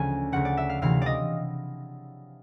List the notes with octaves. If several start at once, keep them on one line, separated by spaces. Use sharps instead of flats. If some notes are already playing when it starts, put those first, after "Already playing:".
Already playing: D2 C#3 F3 G#5
D2 C#3 F3 F#5
D5
E5
F5
D2 C3 E3 F5
D5 D#5